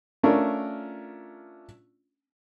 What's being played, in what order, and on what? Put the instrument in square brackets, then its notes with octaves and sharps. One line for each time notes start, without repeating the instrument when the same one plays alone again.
[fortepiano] A3 C#4 D4 F4 A#4